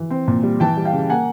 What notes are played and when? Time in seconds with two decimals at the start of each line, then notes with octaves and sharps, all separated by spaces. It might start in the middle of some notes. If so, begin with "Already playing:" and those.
Already playing: E3
0.10 C4
0.28 A#2
0.43 G3
0.60 E3 G5 A5
0.77 G3
0.85 F5 G5
0.93 C#3
1.10 A#3 F#5 G#5